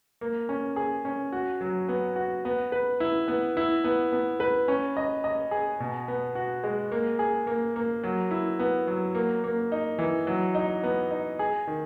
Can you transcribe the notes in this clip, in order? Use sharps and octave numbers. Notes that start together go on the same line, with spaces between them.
A#3
C#4
G#4
C#4
F#4
F#3
B3
F#4
B3
B4
E4
B3
E4
B3
B3
B4
C#4
D#5
D#5
G#4
B2
B3
F#4
G#3
A#3
G#4
A#3
A#3
F#3
E4
B3
F#3
A#3
A#3
D#4
E3
F#3
D#4
B3
D#4
G#4
D#3